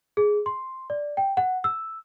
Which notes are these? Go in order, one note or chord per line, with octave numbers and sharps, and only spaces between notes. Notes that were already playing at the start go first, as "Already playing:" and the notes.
G#4
C6
D5
G5
F#5
E6